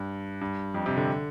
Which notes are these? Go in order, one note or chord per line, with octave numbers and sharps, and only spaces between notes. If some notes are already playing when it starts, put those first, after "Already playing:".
Already playing: G2
G2
F2
C3
D3